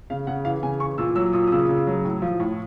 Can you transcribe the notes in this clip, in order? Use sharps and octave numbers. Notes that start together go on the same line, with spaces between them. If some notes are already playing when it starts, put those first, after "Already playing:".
C#3 F5
C#3 F#5
E3 F5
C#3 G#5
E3 C#6
A#2 E6
F#3 E6
A#2 D#6
D#6
C#3 E6
C#3
F#3
A2
F3
A2